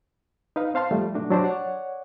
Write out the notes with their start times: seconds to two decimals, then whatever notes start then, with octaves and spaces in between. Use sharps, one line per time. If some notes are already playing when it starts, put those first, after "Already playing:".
0.56 D#4 B4 F5
0.74 C4 C5 F5 A5 C6
0.91 F3 G3 A3
1.14 B2 F#3 A3 D4 F#4
1.31 F#3 D4 G4 C5
1.44 C#5 D5 F#5